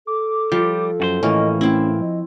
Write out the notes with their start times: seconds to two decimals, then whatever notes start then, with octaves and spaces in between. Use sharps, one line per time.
0.07 A4 D6
0.52 F3 G3 G4
1.00 F#2 F#4 C5
1.23 A2 E3 A#3 C#4 D#5
1.61 A3 C4 C#4 E4
2.01 F3 D#5